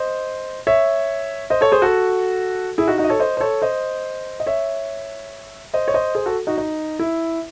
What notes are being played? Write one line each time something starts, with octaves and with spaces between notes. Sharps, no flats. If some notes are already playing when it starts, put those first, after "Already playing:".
Already playing: C5 D#5
C#5 E5
C5 D#5
A4 C#5
G#4 C5
F#4 A4
E4 G#4
D#4 F#4
D#4 F#4
D#5
A4 C#5
C5 D#5
C5
A4 C#5
C5 D#5
D#5
C#5 E5
C5 D#5
C#5
C5 D#5
G#4 C5
F#4 A4
D#4 F#4
D#4
E4